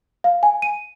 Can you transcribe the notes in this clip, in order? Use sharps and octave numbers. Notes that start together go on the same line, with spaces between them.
F5
G#5
D#7